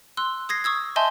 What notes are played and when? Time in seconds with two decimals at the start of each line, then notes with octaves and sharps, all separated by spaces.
0.17 C6 E6 F#6
0.49 D#6 G#6 A#6 C7
0.64 C#6 D#6 E6 G#6
0.96 D#5 E5 G#5 A5 C6 G6